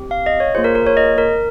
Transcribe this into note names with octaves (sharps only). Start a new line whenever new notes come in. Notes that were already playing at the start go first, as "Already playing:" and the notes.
Already playing: C4 G4
F5
D#5
C#5
A#3 F4 G#4 C5
A#4
A#4
C#5
D#5
A#4